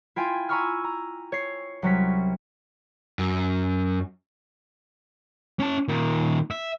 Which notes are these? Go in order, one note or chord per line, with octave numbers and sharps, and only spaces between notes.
E4 F4 G5 G#5 C6
G#5 A#5 B5 C#6 E6 F6
A#5
C#5 C7
C2 F#3 C#4 B6
F#2
C#4 A5
A#2 D#3
E5